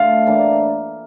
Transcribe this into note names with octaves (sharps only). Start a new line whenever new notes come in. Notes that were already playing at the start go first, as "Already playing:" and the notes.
Already playing: D3 A3 D4 F4 F5
A2 E3 A#3 D4